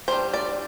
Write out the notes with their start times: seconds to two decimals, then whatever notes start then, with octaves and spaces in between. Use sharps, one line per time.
0.08 G3 D4 C5
0.34 D5